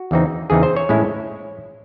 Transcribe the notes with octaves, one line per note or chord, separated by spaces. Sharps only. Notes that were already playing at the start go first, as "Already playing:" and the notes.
Already playing: F#4
E2 C#3 E3 C4 D#4
E2 C#3 E3 C4 D#4 G#4
C5
C#5
A2 G#3 C#4 E4